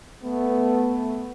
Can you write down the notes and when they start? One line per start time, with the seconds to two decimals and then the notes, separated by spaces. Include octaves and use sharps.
0.23 A3 B3